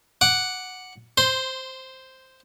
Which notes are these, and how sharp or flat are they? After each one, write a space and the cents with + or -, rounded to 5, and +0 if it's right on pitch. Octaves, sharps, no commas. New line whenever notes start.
F#5 +0 D6 +0
C5 +0 C6 -15